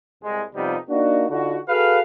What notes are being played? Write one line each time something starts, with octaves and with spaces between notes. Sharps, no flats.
C2 G#3
F2 C3 F3 G3 B3 D#4
A#3 D4 D#4 F#4
D3 D#4 F4 F#4
F#4 G#4 A4 B4 F5